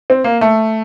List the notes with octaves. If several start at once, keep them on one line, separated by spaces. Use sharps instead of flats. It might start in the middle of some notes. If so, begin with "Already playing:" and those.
C4
A#3
A3